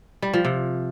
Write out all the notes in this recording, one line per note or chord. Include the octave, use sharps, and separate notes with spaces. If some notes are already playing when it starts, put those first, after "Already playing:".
G3
F3
C3